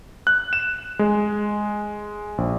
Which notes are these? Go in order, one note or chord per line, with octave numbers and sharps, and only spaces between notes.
F#6
E7
G#3
A#1